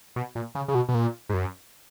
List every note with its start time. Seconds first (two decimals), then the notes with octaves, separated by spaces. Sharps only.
0.16 B2
0.35 A#2
0.55 C#3
0.68 C#3
0.75 B2
0.89 B2
0.95 A#2
1.29 G#2
1.34 F#2